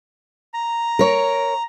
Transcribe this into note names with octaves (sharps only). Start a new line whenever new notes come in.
A#5
A#4 C#5